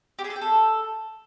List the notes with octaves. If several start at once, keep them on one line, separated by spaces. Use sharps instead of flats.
G4
G#4
A4
G5
A4